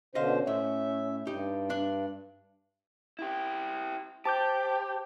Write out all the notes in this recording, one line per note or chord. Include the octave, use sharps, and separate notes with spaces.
B2 D3 C#4 C5 D#5 F5
A2 E5
G2 D#4 G4
D4
E4 G4
G4 C5 A5 D6 G6